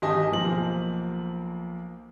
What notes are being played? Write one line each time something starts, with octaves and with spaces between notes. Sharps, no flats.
G#1 G4 D#5 G#5 A5
B1 F3 A#3 F#7